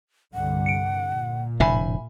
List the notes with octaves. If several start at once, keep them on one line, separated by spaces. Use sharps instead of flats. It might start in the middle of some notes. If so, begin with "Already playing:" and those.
C2 G2 D3 F#5
C#7 D7
A#2
F1 A2 D3 E5 G#5 B5